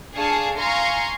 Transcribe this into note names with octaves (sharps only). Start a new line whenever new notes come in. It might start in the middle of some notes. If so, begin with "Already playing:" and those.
D4 G#4 F5 G#5 A5 C#6
F5 G#5 A#5 C6 C#6